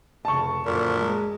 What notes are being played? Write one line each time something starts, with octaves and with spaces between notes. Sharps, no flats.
F1 C#3 A5 C#6
F#2 A#2 D3
G#3